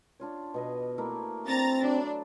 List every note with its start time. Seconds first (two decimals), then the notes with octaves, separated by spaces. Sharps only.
0.20 D4 F4 C#5
0.54 B2 B3 D#5
0.98 A3 A#3 E4
1.47 C4 D4 A#5 B5 A6 A#6
1.82 F#3 D4 C5